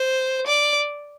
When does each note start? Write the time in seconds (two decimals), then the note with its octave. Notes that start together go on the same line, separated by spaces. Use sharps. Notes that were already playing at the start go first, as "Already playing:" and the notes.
Already playing: C5
0.47 D5